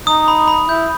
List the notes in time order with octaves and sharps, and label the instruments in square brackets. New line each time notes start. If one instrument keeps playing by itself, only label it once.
[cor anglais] D#4 [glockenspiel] D#6
[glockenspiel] B5
B5
[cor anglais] E4 [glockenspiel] G6